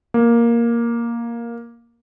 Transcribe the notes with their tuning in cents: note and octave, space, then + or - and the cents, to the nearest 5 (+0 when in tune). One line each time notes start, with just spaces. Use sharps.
A#3 +5